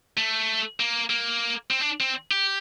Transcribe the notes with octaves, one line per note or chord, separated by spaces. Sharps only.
A3
A#3
A#3
C4
D4
C4
G4